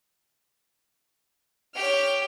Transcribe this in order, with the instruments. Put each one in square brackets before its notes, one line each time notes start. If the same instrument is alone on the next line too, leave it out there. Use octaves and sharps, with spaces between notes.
[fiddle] G4 G5 [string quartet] C#5 F6